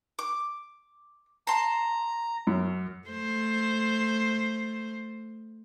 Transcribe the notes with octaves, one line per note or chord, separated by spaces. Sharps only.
D6
A5 A#5 C6
F#2
A3 C5